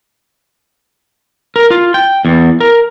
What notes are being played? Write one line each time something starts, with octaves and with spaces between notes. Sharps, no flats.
A#4
F4
G5
E2
A#4